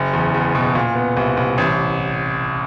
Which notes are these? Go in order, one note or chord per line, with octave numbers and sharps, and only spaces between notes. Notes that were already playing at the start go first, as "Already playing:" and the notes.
Already playing: F#1
E2
E2
B2
A#2
B3
C2
C2
A1